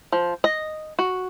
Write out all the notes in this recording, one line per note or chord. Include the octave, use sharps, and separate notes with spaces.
F3
D#5
F#4